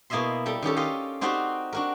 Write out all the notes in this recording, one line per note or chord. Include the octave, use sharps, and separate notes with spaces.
B2 A#3 E4 D#5 E5 C6
G3 A4 G5 A#5
D#3 C#4 G4 A4
F4 G4 D#5 F5
C4 D#4 F#4 G4 C5 D5
D4 F#4 A#4